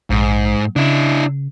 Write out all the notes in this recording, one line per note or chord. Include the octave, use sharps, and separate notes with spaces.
A#1 G#2
C#3 D4 E4